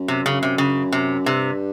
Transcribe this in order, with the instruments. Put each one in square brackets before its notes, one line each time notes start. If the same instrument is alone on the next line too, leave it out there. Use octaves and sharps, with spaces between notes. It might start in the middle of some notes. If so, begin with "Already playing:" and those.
Already playing: [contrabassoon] F#2
[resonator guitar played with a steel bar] C3
C#3
C3
C#3
C3
[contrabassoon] G2 [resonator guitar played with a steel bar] C3